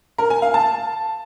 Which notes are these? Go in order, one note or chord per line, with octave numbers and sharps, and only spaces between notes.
A#4
G#5
F5
A5